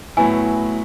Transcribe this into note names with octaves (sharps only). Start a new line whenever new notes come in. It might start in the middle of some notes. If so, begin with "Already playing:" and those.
A2 F#3 B3 E4 G#5